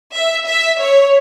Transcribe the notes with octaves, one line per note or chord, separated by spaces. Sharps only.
E5
E5
C#5